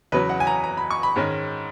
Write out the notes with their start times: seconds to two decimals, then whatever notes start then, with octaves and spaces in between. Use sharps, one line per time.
0.12 E2 C#3 F#3 B4
0.29 F#5
0.40 G#5
0.47 A#5
0.64 A#5
0.77 B5
0.91 C#6
1.03 B5
1.16 G#2 D#3 G#3 C#4